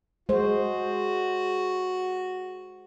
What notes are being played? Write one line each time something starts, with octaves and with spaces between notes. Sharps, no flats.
G#3 F#4 C5